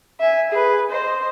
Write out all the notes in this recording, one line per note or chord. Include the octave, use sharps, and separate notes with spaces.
E5 G#5
G#4 B4
C5 D#5